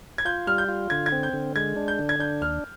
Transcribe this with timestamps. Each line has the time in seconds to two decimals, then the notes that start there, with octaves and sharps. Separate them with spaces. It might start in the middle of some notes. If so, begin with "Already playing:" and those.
0.18 G#6
0.25 F4 G6
0.47 G3 F6
0.58 G6
0.68 F4
0.90 D3 G#6
1.06 G#6
1.12 C4
1.23 G6
1.33 D3
1.56 G#3 G#6
1.76 D4
1.88 G6
1.99 D3
2.09 G#6
2.19 D4 G6
2.42 D#2 F6